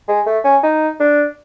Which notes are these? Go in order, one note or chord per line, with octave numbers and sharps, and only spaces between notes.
G#3
A3
C#4
D#4
D4